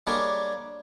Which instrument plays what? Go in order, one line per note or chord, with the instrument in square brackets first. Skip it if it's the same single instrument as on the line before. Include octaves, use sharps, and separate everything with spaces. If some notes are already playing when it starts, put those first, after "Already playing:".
[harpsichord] G3 G#3 A#3 D4 A#4 C#5